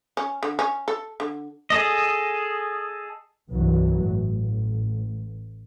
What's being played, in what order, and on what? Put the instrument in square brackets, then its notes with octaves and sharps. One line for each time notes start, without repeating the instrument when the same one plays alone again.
[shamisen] C#4
D3
C#4
A4
D3
[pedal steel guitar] G#4 A4 D#5
[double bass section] C2 G2 E3 F#3
A1